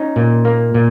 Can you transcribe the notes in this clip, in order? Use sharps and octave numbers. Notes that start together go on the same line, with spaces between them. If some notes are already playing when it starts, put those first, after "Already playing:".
Already playing: C#4 D#4
A#2
A#3
A#2